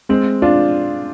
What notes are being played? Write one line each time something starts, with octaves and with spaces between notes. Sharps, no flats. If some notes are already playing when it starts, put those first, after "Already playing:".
G#3 C4
D4 F4